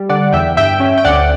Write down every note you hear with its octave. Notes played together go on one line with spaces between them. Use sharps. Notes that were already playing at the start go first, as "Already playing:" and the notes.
Already playing: G3
D3 D5 F#5
E2 E5 G5
G2 E5 G5
C#4
G5
D2 D5 F#5